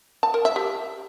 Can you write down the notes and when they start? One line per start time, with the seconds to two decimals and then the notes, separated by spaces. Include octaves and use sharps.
0.23 A5
0.34 A#4
0.45 E5
0.56 G4